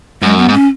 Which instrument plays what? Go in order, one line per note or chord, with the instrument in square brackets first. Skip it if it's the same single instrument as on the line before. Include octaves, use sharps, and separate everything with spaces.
[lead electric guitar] F#2 [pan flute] G#3
[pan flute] B3
[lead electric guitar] G#2
[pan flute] C#4